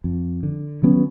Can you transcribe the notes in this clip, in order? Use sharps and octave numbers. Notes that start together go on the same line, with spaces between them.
F2
D3
D#3 F#3 B3 C#4